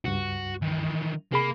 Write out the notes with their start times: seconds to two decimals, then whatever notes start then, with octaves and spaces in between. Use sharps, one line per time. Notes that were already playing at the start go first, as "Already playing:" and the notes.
0.05 C#2 G2 F#4
0.62 D#3 E3
1.32 C3 A#3 G#4 B5